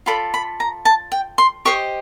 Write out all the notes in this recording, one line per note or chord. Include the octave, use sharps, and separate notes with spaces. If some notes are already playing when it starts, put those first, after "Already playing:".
F4 A4 D5 B5
B5
A#5
A5
G5
C6
G4 C5 D#5 C#6